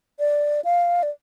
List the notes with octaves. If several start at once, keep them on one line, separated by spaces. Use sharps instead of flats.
D5
F5
D5